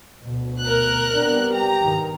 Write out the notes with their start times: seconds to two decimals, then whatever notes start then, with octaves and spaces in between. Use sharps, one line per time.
0.21 D2 B2
0.60 A#4 F#6
1.14 C3 G3 B3 D4
1.52 G4 A#5
1.81 E2 G2 D#3